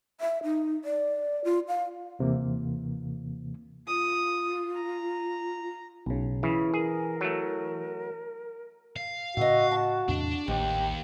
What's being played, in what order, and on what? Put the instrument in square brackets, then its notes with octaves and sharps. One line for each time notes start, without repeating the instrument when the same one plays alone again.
[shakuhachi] E5
D#4
D5
F4
F5
[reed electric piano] D#2 C3 E3 A#3
[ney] F4 [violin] D#6
[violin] A#5
[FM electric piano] B1 C#3
[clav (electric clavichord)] C#3 [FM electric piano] E3 [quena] E4
[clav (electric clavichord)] G#4 [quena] A#4
[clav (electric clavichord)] F#3 A3
[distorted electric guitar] F5
[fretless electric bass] A2 C#3 [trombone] F#4 [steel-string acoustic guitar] D#5 E5
[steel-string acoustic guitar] A5
[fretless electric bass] E2 A2 C3 [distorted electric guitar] D4
[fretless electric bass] A1 [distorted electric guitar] D#2 [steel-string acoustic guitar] G#2 [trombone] G4